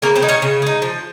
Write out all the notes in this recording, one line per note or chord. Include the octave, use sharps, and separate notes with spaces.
C#3 A#3 A#4
C4 C5
G#3 D#4
C#4 C#5
C#3
G#3 D#4
F3